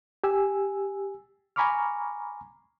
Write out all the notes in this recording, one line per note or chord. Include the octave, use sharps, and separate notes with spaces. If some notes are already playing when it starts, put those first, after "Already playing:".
G4 G#5 E6
G#5 A#5 B5 C#6 D6 F6